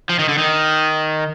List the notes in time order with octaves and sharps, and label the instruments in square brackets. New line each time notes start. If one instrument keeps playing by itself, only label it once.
[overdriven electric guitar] F3
D#3
D3
D#3